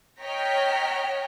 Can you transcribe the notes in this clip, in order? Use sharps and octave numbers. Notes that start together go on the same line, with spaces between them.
C#5 D#5 G5 A#5 F6 B6